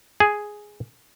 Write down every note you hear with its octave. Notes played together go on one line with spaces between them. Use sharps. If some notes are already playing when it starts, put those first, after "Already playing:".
G#4